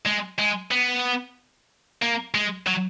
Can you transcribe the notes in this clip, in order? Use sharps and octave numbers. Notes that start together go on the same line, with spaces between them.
G#3
G#3
B3
A#3
G#3
F#3